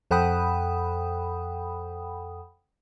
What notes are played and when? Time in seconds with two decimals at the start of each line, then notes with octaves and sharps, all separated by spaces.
0.11 F2 A4 F#5 G5 B5 D#6